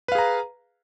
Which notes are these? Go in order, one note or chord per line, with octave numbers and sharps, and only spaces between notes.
G#4 B4 F5 A#5